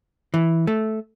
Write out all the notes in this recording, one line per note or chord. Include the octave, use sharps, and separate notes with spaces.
E3
A3